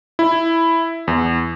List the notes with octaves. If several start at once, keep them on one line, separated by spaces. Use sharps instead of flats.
E4
E2